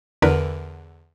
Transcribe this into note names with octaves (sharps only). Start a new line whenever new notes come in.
E2 D3 A#4 B4